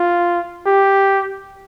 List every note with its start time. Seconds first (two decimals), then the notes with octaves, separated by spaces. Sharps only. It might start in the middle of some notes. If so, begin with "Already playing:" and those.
Already playing: F4
0.66 G4